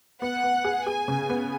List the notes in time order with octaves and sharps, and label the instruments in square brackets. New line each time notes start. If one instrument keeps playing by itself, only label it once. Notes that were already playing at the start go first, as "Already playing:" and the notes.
[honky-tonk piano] B3 [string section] F#5
[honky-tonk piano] B3
G#4
[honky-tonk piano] G#4 [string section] G#5
[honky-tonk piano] C#3
B3